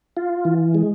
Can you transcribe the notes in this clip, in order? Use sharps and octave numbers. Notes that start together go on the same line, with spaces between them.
F4
E3
G#3